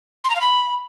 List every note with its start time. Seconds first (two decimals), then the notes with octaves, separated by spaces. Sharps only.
0.24 C6
0.29 A#5
0.35 F5
0.41 B5